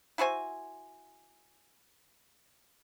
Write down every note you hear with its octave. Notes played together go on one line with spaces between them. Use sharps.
E4 F#4 C5 G#5